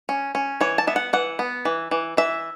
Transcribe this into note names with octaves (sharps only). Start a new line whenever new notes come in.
C#4
C#4
E3 C#5
A5
B3 E5
F#5
E3 F#5
B3
E3
E3
E3 E5